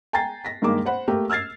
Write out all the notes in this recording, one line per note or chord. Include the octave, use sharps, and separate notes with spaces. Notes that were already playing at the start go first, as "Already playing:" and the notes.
G5 G#5 A#5 A6 C7
A#6 B6
G2 D#3 G#3 A#3 D6
C5 F#5 B5
A3 A#3 G4 A#4
E6 F6 G#6 A6 C7